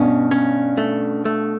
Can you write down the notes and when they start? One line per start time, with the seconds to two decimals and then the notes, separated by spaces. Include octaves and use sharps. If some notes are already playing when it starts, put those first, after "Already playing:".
Already playing: G2 B2 C#4
0.31 C#4
0.78 A3
1.25 A3